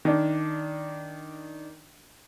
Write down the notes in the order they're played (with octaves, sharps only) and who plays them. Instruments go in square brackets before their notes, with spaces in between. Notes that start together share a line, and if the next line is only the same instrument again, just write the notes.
[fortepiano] D#3 D4